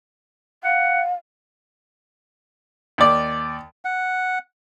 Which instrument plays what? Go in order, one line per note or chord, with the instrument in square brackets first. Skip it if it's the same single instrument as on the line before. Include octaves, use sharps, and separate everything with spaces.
[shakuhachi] F5 [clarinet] F#5
[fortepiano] D#2 D5
[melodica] F#5